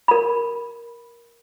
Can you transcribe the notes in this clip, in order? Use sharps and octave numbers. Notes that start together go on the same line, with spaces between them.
A#4 B5